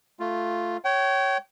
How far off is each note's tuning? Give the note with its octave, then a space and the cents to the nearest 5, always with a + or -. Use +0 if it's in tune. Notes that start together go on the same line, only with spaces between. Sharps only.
A3 +0 F4 +0
C#5 +0 G5 -35